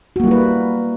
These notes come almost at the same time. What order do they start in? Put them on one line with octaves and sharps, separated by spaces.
F#4 A#3 G3 E4 B4